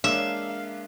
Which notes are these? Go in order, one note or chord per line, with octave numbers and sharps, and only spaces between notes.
G#3 A#3 D4 E5 F5